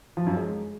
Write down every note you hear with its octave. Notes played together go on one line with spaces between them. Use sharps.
F3
F#2
G#3